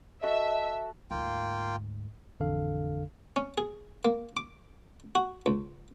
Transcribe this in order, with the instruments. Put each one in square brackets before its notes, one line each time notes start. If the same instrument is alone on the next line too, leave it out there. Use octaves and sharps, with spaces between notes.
[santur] F#4 A4 [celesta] D#5 [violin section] E5
[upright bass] D2 G#2 [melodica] A#3 F4 G5
[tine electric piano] A1 F2 D3 D4 A4 F5
[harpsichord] C#4
G#4
A#3
D6
F#4
C#2